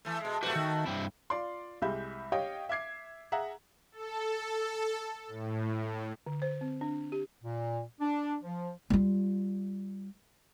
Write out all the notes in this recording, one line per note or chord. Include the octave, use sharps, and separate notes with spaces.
E3 A3
B2 G#3
A3 F#4 G4 B4 C5
D#3
G2 C4 E4
F4 D5 C6
C2 G#3 G4 E5 B5 G6
G4 C#5 D#5 F5 G5
E5 D6 G#6 C7
G#4 E5 F#5 A#5
A4
A2
D3
C5
C4
D4
G4
A#2
D4
F3
G3 F4